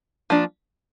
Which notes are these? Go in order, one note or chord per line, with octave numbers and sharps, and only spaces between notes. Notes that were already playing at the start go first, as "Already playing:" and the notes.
F3 A#3 D4